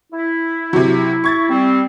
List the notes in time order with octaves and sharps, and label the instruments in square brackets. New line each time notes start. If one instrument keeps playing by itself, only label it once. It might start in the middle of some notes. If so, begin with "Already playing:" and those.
[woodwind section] E4
[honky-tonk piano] C3 F#3
C#6 G#6 A6
[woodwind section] G3 C4